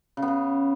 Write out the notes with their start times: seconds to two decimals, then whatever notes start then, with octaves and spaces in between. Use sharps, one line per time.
0.17 C#3
0.22 B3
0.28 C#3